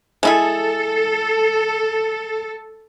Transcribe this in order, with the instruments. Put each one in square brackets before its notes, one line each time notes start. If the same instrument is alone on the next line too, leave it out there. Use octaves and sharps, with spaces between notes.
[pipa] G#3 E4 G#4 [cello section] A4